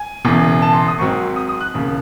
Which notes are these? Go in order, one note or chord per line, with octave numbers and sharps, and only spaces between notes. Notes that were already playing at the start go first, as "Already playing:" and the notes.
Already playing: G#5
E1 E2 C#3
A5
C6
D#6
G#1 G#2 F#3 C4 C#6
D#6
D#6
F#6
E1 D#2 C#3